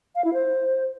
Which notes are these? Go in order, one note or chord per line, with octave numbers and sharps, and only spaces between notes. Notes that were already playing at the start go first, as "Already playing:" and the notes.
F5
E4
C5